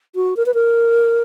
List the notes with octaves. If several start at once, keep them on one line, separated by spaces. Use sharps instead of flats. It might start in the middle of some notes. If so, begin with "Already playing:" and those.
F#4
A#4
B4
A#4